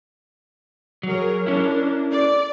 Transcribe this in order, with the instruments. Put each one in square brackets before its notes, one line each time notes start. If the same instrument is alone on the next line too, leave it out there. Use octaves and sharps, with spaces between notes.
[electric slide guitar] F#3 [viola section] G#4 A#4 C#5
[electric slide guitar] C#4 E4 [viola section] D4 A#4
[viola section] D5